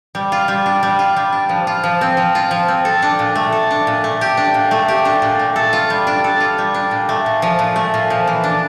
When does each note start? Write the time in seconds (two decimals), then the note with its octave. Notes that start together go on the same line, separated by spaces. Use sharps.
0.15 G3
0.32 F4
0.48 G3
0.66 D4
0.83 G3
0.99 F4
1.16 G3
1.32 D4
1.49 F3
1.67 F4
1.84 F3
2.01 C4
2.17 F3
2.35 F4
2.51 F3
2.68 C4
2.85 A4
3.02 D4
3.19 A#2
3.35 A3
3.52 A4
3.71 D4
3.87 A#2
4.04 A3
4.21 G4
4.37 D4
4.54 A#2
4.71 A3
4.88 G4
5.05 D4
5.22 A#2
5.39 A3
5.56 A4
5.73 F4
5.90 G3
6.07 D4
6.24 A4
6.40 F4
6.58 G3
6.74 D4
6.91 A#2
7.09 A3
7.26 A#2
7.42 F3
7.59 A#2
7.76 A3
7.94 A#2
8.10 F3
8.28 E3
8.44 D4